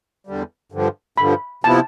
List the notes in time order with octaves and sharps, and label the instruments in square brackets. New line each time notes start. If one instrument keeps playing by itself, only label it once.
[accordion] E2 D3 G3
G2 D3 F3
[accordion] G2 D3 F3 [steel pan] B5
[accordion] C3 F3 B3 E4 [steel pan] A5